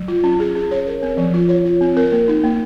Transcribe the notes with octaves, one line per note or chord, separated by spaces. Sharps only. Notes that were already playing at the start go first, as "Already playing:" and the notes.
Already playing: F#3
F4
C#4
G#4
C#4
C#5
A#4
C4
F3
F4
C#5
F4
C4
A#4
A#3
D#4
A#3